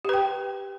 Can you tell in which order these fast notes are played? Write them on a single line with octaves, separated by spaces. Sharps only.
G4 B4 G5